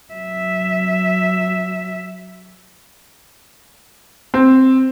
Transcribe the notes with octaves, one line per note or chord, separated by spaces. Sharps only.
F#3 E5
C4